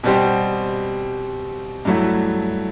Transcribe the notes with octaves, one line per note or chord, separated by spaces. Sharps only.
B2 G3 C4 G4
G2 F#3 A3 E4